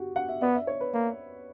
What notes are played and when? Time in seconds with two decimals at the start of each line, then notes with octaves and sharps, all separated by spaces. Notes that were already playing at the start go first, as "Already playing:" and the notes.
Already playing: F#4 G4
0.16 F#5
0.29 E5
0.42 B3 D5
0.55 E5
0.67 C#5
0.81 B4
0.94 A#3